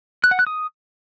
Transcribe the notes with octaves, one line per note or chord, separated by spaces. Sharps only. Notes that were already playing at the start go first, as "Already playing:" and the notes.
F#6
F#5
F#6
D#6